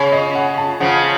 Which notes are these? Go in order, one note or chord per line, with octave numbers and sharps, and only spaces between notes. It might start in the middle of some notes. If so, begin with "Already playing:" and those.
Already playing: C#3 C#5
D#5
F#5
A5
C#3 F3 F#5